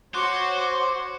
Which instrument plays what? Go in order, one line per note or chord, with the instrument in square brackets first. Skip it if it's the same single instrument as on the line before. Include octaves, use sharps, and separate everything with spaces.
[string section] F#4 C#5 [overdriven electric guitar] C5 [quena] D6 [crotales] F#6 C#7